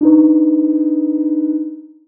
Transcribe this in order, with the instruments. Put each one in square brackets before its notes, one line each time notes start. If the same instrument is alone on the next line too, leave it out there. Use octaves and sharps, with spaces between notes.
[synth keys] D4 D#4 B4